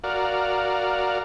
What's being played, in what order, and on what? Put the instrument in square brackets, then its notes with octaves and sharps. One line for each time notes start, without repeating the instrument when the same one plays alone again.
[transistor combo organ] F#4 A#4 D5 F5